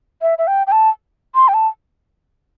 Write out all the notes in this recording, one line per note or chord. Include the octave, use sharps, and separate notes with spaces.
E5
E5
G5
G5
A5
C6
G5
A5